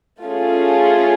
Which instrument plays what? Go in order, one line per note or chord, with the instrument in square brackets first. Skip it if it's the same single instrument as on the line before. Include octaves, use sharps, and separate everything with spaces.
[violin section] A3 C#4 F4 G#4